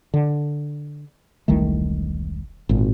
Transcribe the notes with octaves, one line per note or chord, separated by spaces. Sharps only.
D3
E1 C2 D#3 A3
G#1 A#2